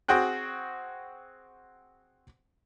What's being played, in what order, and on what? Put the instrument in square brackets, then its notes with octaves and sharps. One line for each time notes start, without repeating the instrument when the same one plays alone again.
[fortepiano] C4 F#4 G#4 G5 F#6